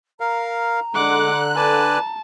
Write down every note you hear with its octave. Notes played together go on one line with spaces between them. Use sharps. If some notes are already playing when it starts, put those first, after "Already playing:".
A#4 F5 A#5
D3 G#3 F#5 D6 F#6
B4 D5 G#5 A5